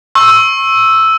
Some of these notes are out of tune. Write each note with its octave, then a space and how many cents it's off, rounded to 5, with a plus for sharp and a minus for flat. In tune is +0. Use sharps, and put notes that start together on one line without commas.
C#6 -35 E6 +0